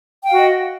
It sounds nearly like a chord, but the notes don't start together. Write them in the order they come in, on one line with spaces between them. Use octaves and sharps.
G5 F5 F#4 D#5